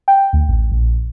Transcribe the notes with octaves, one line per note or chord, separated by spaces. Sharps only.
G5
D2
A1
A#1